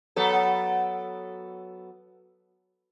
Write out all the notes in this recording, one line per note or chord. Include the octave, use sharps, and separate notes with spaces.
F#3 B3 A4